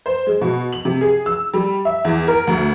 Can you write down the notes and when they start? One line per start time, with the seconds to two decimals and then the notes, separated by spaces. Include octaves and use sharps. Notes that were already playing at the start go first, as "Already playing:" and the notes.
0.06 C5
0.27 G#3
0.41 B2
0.73 F#7
0.85 C3
1.01 G#4
1.26 E6
1.54 G3
1.85 E5
2.05 E2
2.28 A#4
2.47 D2